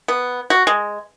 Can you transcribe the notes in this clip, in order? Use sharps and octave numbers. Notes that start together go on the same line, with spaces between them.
B3
F#4
G#3